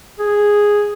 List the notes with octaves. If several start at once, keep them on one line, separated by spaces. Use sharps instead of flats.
G#4